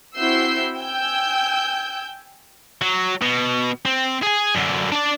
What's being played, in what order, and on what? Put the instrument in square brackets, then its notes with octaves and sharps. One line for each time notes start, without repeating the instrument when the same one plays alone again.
[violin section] C4 E4 F#4 E6 G6 C7
G5 G#5 E6 G6
[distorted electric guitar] F#3
B2
C4
G#4 G#5
F#2 D3
D4 D5